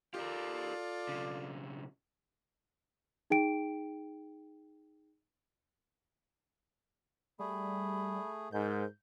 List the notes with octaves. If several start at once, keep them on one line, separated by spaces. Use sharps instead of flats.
F4 G4 A4 A#4 D5
B1 C#3
D#4 G#4 G5 D7
G3 A3 G#4 B5
G#2 A#4 G6